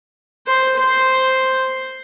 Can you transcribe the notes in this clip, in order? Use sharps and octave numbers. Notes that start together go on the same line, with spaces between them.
C5
C5